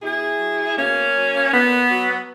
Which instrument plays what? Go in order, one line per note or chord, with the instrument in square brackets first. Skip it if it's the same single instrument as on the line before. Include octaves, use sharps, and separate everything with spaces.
[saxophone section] B2 E4 G#4
F#3
B2 A#3 C#4
F#3
A#2 B3
F#3